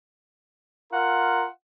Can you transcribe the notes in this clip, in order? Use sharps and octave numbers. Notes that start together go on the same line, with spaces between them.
F4 A#4 F#5